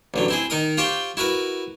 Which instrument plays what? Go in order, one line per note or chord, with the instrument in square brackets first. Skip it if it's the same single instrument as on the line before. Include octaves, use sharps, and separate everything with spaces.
[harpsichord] A1 D3 F#3
C4 E4 G#4
D#3 D#4 A#4 D#6
F4 G4 C5 G5 C#6
E4 F#4 A#4 B4